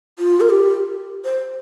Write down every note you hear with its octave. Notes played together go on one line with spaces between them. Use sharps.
F4
A#4
G4
C5